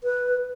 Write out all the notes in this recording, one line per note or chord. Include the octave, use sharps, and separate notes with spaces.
B4